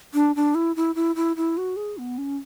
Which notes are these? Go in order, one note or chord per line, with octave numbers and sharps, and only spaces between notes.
D4
D4
E4
E4
E4
E4
E4
F#4
G#4
B3
C#4